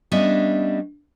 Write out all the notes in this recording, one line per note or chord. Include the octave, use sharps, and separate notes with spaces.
G3 B3 C#4 D4 D#5 E5